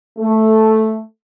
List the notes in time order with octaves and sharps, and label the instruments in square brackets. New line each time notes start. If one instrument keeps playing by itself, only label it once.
[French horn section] A3